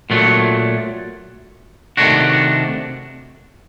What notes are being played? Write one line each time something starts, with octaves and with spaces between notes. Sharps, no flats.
A#2 F#3 A3
C3 D#3 A3 D4 F#4